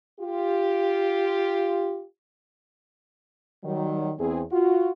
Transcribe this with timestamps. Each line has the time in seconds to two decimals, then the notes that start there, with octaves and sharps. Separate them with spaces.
0.20 F4 G4
3.64 D#3 F#3 G3
4.19 E2 C4 G#4
4.52 F4 F#4